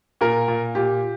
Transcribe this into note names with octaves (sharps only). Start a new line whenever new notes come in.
A#2 A#4
A#2
A#2 G4